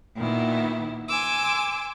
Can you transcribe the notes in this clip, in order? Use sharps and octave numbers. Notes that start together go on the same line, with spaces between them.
A#2 D#3 B3 E4
G#5 C6 D6 E6